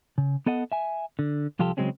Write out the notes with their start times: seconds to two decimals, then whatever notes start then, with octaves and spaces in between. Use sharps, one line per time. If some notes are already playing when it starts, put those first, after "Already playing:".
0.18 C#3
0.46 B3 A4 D#5 F#5
0.72 E5 G#5
1.19 D3
1.59 C2 F3 F4 G4 A4
1.77 C#3 E3 F#3 G#3 C4 C#4